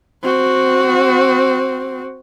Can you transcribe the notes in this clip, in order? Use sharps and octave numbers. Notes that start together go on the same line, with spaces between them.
C4 F#4